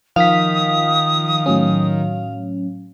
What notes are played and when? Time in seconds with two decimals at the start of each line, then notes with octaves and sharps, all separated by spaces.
0.16 D#3 F3 F5 D#6 B6
1.46 A2 F#3 C#4